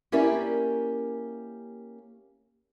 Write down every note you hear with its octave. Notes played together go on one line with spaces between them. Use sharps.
A#3 C#4 E4 G4 A#4 D5